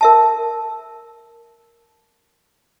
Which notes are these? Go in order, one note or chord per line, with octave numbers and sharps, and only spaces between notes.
A#4 E5 A5